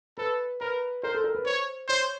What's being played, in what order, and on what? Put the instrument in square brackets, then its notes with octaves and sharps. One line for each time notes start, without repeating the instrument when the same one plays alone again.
[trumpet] A4 [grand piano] B4
[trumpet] A#4 [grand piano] B4
[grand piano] A#4 [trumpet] C5
[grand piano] A4
A#4
B4
[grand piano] C5 [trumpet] C#5
[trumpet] C5 [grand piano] C#5